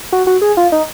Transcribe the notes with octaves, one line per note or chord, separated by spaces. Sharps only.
F#4
F#4
G#4
F4
D#4